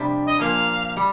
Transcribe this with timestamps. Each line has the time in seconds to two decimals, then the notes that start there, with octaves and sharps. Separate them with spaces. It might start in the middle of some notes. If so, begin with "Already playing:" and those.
Already playing: F2 C3 G3 D4 G4
0.26 D#5
0.40 A#2 F3 A#3 F5
0.97 G3